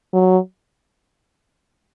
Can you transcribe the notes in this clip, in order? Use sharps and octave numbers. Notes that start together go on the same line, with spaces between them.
F#3